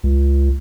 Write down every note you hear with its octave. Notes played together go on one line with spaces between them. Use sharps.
C#2